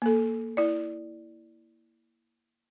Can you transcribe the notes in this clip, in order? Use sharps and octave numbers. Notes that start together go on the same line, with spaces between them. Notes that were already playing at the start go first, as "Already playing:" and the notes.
A#3 A4
E4 D5